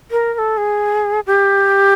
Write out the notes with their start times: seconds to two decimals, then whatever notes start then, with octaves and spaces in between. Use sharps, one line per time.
0.11 A#4
0.34 A#4
0.38 A4
0.57 G#4
1.27 G4